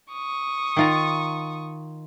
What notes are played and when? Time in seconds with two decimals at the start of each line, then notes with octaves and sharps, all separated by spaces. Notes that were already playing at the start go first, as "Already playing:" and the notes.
0.13 C#6 D#6
0.77 D#3 F4 A#5